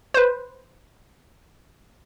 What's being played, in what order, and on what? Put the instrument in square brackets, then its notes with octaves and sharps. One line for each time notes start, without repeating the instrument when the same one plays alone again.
[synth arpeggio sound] B4 C5